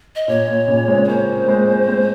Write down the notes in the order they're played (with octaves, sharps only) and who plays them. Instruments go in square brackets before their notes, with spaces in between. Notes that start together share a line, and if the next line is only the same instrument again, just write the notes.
[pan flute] D#5
[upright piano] A#2 [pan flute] C#5
[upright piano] A#2
A#2 C#3
G#3 C4
[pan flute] C#5
[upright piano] A#3 C#4 [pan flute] C5
[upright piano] G#3 C4
G#3 C4